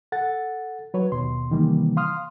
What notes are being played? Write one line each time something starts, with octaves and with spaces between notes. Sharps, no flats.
A4 F#5 A6
F#3 B4 C#5
D#2 B2 C6
C3 D#3 E3 G3 A#3
F5 C6 D#6 F6